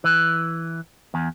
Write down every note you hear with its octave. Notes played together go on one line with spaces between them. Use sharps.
E3
E2